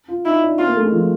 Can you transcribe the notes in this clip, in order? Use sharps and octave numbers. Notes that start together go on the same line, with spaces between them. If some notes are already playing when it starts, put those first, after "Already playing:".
F4
D#4 E4
D4
C4 F4
A#3
A3
G#3
F3